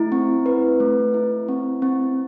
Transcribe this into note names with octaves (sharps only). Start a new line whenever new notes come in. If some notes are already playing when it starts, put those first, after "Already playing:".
Already playing: A3 E4
C4
B4
A3
E4
C4
C4